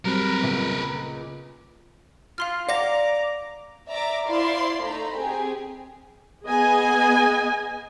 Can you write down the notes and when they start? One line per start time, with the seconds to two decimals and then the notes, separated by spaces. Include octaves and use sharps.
0.05 F#3 G3 C4 A#4 B4
0.41 C#2 A#2 B3
2.38 F4 F5 C6 F6
2.69 D5 F5 F#5 A#5 D6 A#6
3.88 D5 E5 A#5 D6
4.28 E4 F4 C5 D5 F5 C6
4.84 A3 D#4 A#5 B5
5.18 C4 G4 G#4 G#5
6.45 B3 G#4 D#5 G#5